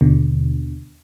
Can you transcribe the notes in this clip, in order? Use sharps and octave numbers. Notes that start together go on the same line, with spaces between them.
D#2 B2 D3